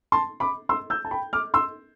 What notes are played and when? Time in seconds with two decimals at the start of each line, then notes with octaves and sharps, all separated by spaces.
0.12 A5 C6
0.40 B5 D6
0.69 C6 E6
0.90 E6 G6
1.05 A5
1.11 G5 B5
1.33 D6 F6
1.54 C6 E6